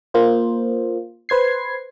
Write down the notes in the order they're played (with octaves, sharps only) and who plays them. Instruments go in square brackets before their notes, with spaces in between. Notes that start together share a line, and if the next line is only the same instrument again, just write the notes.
[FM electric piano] A#3 F4 C5
B4 C5 G#6 C7